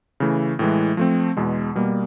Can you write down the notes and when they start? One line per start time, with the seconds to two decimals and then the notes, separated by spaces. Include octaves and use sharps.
0.20 C#3 E3 A3
0.59 A2 E3 G#3
0.97 F3 A3 C4
1.37 E2 B2 G#3
1.75 B2 G3 A#3